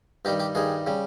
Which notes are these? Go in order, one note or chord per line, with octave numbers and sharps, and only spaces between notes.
G2 D#3 G3 G4
G4
G2 D#3 G3 G#4
C#3 G3